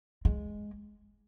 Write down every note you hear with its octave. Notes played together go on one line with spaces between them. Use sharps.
G#3